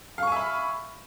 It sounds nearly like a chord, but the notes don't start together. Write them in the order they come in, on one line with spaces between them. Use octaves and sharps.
F5 C#6 G#5 E5 B5